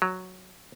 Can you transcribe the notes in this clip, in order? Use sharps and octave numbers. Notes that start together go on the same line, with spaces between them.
F#3